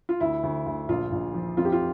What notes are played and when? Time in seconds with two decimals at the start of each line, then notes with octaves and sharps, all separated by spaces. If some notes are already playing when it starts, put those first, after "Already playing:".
0.09 F4
0.20 D2 E4
0.43 D2
0.66 D2
0.89 A#1 F4
1.12 A#1
1.34 F3
1.57 F2 F4
1.65 G4
1.72 F4